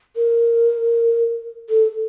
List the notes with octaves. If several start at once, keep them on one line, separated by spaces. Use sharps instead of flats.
A#4
A4